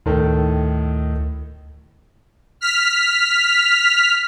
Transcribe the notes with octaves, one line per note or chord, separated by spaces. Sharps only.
D2 A2 D#3 A4
F6 B6